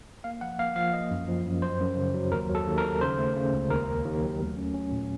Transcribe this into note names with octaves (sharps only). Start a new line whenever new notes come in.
A#3 F5
F3 F#5
A#3 F5
F3 F5
A#3 D#5
F#2
F3
F#2
F#3 C5
F#2
C#3
F#3
D#2 A#4
F#3
A4
D#2
A#4
D#3
C#3 C5
A3
C#3
C#2
D#2 A#4
D#2
D#2
F#3
A3
C#4
C#4
A#2